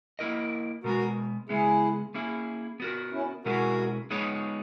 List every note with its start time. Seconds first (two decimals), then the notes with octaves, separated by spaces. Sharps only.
0.19 A#3 E4 A#4 D#5
0.84 B2 G#3 B3 F#4 A#4
1.49 C#3 G#3 B3 E4 G#4
2.14 A#3 C#4 E4 G#4
2.80 B3 F#4 A#4
3.12 C#4 E4
3.45 B2 G#3 C#4 E4 F#4 G#4 A#4
4.10 G#3 B3 D#4 G#4 C#5